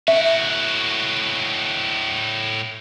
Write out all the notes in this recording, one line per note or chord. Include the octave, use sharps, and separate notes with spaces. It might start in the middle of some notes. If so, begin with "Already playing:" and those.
A2 F#4 E5